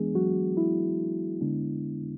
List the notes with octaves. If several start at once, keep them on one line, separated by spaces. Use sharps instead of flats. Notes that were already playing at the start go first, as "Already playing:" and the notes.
Already playing: E3 G#3 B3 D4 G#4
F#3 F#4
E4
D3 G#3 B3 D4